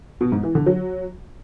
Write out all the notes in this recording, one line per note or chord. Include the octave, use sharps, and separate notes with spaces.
B2
G#2
E3
D3
F#3